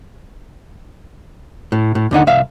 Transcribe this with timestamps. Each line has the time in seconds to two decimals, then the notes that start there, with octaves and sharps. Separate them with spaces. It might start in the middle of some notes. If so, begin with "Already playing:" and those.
1.72 A2
1.95 A2
2.11 D#2 D3 D#4 F#5
2.27 C2 E5 F5